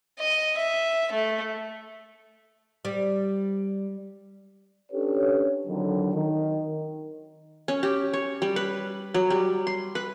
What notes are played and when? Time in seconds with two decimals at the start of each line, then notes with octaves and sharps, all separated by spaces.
0.19 D#5
0.57 E5
1.12 A3
2.85 G3
4.92 C#4 D4 G4 A4 B4 C#5
5.67 F2 D3 D#3 F#3
6.14 D#3
7.68 C#4
7.83 G4
8.13 C#5
8.42 G3
8.56 B4
9.14 F#3
9.30 G3
9.67 C6
9.95 B4